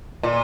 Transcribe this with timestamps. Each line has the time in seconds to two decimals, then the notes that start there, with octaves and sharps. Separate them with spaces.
0.23 A#2